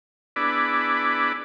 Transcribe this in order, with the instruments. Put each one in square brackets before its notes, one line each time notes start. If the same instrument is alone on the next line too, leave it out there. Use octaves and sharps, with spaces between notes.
[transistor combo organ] B3 D4 E4 G#4 B4 D5